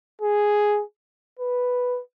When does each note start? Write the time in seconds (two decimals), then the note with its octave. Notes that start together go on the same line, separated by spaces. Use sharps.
0.22 G#4
1.39 B4